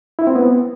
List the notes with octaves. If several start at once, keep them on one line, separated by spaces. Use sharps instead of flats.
E4
C4
B3